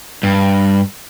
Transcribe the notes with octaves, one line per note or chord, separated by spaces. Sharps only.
G2